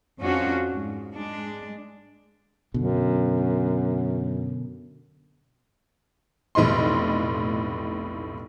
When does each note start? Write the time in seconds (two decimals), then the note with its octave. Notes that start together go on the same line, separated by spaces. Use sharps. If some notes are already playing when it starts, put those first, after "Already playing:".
0.20 F2 F3 C#4 D4 F4 F#4
0.70 G#2
1.15 G#3 D4
2.74 F#2 B2 D3
6.55 F1 B1 A2 D#5 C6